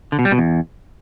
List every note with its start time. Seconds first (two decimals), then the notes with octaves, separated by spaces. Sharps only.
0.12 D3
0.19 B2
0.25 G3
0.32 B2
0.38 E2